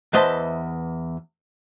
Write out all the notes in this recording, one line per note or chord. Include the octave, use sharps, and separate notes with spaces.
E2 B4 C5 D#5 E5 A5